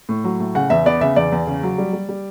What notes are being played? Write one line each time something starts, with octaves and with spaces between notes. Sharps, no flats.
A2
F#3
A2
C#3 F#5
E2 E5
B3 D5
C#3 E5
E2 D5
E2
C#3
F#3
G3
G3
G3